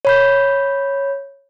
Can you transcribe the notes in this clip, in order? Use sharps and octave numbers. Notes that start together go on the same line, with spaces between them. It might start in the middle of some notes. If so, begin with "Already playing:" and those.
C#5 B5 G6